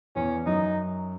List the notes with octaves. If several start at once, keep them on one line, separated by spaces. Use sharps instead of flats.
E2 E3 C#4
F#2 F#3 D#4